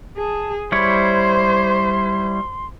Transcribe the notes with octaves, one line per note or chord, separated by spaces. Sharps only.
G#4 A5
G3 E4 C5 C#5 C6